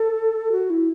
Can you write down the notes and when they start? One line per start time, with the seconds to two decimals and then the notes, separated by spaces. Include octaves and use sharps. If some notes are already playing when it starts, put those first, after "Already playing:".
Already playing: A4
0.52 F#4
0.70 E4